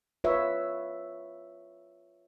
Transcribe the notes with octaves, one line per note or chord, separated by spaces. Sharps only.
F4 B4 C#5 E5